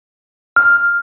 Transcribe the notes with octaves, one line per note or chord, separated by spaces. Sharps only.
F6